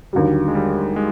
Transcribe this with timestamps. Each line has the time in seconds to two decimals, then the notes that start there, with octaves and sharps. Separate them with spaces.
0.13 D#2 D3 F#3 G3
0.48 G#3
0.55 G3
0.96 G#3